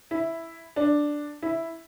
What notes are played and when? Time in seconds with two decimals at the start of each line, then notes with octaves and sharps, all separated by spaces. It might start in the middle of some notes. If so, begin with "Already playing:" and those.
0.11 E4
0.76 D4
1.42 E4